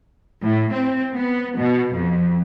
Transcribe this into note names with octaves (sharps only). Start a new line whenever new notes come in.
A2
C4
B3
B2
F2